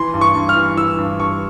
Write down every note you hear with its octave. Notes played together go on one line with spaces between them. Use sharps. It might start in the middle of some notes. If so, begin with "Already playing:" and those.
Already playing: E3 C6
G2
C#6
G2
F6
E3
E3 E6
G2
G2 C#6